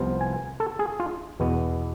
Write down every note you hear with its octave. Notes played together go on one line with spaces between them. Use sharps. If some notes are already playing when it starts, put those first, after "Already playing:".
Already playing: C2 C3 F3 B3 F4
G#5
A4
G#4
F4
E2 B2 B3